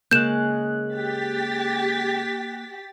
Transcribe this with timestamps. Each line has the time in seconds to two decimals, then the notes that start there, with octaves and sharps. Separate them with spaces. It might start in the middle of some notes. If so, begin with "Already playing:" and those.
0.11 C#3 G#3 A#3 F#6 G6 E7
0.94 G4 A6 B6